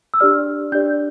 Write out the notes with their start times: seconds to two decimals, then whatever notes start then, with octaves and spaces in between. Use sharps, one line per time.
0.14 E6
0.20 D4 G4 D5 F6
0.72 D4 G4 D5 G6